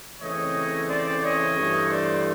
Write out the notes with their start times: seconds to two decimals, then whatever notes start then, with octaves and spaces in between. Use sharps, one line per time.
0.21 C#3 E3 A3 C4 C#5 D#5
0.89 C5 D5
1.22 C#5 D#5
1.56 G2 E3 A3
1.91 C5 D5